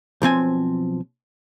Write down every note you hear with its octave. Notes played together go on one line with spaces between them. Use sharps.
B1 F3 C4 G#5